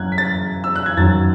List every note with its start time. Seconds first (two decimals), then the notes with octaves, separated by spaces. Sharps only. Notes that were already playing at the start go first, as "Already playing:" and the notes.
Already playing: F#2 F#3 F#6 G#6
0.12 B6
0.18 A6
0.64 E6
0.76 F#6
0.86 G#6
0.97 F#2 D#3 F#3 A6